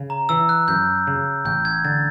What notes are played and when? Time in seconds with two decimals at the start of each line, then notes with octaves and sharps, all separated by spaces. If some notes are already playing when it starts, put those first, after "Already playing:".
Already playing: C#3
0.10 A#5
0.29 E3 E6
0.49 F#6
0.68 F#2 G6
1.07 C#3
1.45 A1 G6
1.65 G#6
1.84 D3 A6